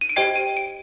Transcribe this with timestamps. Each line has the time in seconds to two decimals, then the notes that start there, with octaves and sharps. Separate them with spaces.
0.01 D#7
0.09 D7
0.16 G4 C5 D#5 G5 C7
0.36 D#7
0.57 D7